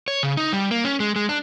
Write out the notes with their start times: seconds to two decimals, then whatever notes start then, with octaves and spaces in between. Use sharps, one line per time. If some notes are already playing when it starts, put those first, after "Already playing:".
0.08 C#5
0.23 C#3
0.37 D#4
0.53 G3
0.71 A#3
0.84 C#4
1.00 G#3
1.16 G#3
1.29 D4